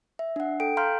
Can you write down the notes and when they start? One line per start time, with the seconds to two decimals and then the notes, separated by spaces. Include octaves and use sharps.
0.19 E5
0.36 D4 F#5
0.60 A4 G5 D7
0.77 F5 A#5 C6 F6 G6